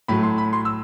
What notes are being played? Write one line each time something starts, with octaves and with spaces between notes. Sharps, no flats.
A2 F#3 A3 B5
C6
B5
C6
E6